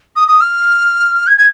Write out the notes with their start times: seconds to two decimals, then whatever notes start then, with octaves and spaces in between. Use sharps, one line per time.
0.16 D#6
0.28 D#6
0.40 F6
1.27 G#6
1.37 G#6